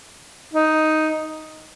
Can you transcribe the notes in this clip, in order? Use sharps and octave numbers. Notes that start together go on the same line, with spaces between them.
D#4